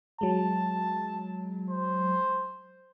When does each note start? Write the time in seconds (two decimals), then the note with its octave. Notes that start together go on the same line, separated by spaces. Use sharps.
0.21 F#3 G#3 A5
1.71 C5